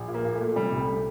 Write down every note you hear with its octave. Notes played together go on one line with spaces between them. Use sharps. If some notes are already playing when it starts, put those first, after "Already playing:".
Already playing: A#1
A#2
A#3
A#2
A#2 A3
C3 G3
C2 A3
C3